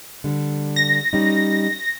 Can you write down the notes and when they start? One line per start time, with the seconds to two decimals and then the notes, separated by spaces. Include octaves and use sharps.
0.24 D3 G3
0.76 A#6
1.13 G3 C#4 D#4